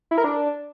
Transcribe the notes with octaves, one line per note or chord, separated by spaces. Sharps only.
E4
A#4
D4